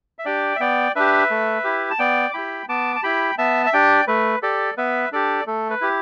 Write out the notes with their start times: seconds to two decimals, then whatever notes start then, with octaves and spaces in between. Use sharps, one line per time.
0.19 E5
0.25 D4 G4 D5 G5
0.56 E5
0.60 B3 D5 G5
0.96 D4 G4 B4 E5
1.31 A3
1.64 E4 G4
1.91 A5
1.99 B3 D5 G5
2.31 D6
2.34 E4 G4 G5 B5
2.68 B3 A5 D6
2.96 A5
3.03 E4 G4 G5 B5
3.38 B3 E5 A5
3.66 E5
3.73 D4 G4 D5 G5
4.07 A3 B4
4.42 G4 A4 D5
4.77 B3 B4 E5
5.12 D4 G4 A4 D5
5.47 A3 A4
5.70 B4
5.81 E4 G4